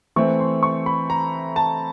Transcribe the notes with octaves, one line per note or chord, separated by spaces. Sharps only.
E3 A3 C4 C#6
C6
C#6
B5
A#5
A5